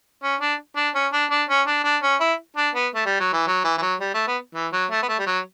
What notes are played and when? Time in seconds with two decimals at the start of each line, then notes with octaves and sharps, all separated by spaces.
0.23 C#4
0.41 D4
0.77 D4
0.95 C#4
1.13 D4
1.31 D4
1.49 C#4
1.67 D4
1.84 D4
2.03 C#4
2.21 E4
2.57 D4
2.75 B3
2.95 A3
3.06 G3
3.20 F#3
3.33 E3
3.47 F#3
3.65 E3
3.78 E3
3.82 F#3
4.00 G3
4.14 A3
4.27 B3
4.55 E3
4.73 F#3
4.91 A3
5.03 B3
5.09 A3
5.19 G3
5.26 F#3